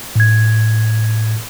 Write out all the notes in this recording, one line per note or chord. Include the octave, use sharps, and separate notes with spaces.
A2 G#6